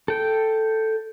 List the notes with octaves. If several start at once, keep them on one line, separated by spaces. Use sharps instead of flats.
A4 G5